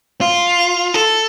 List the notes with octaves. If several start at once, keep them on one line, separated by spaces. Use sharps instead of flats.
F4
A4